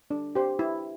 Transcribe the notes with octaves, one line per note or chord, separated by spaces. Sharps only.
D4
G4 C5
E4